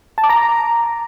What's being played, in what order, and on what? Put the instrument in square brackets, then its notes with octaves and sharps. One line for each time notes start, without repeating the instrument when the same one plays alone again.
[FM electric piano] A5
D6
A#5